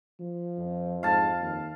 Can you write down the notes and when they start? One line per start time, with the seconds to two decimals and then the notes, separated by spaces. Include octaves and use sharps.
0.19 F3
0.58 F2
1.03 G#2 F5 A5
1.40 D#2